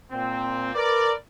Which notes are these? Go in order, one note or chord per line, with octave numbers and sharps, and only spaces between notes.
A#2 C4
A#4 B4 D5